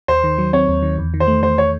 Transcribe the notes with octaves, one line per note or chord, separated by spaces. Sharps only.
D#2 C5
D#3
F#3
C4 C#5
D#2
D#3
E2
D#3
C5
A3
E2 C5
C#5